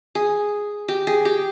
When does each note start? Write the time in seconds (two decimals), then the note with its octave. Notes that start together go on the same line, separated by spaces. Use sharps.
0.15 G#4
0.88 G4
1.07 G#4
1.25 G4